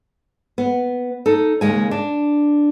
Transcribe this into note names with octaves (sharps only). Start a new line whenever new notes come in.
B3
D#4 A4
D#2 C#3 G#3 G#5
D4